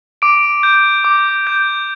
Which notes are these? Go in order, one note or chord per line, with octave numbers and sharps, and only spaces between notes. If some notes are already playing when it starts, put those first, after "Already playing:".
D6 D7
G6
D6
G6